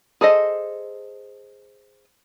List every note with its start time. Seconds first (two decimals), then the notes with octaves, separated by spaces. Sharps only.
0.21 G#4 A4 C5 D#5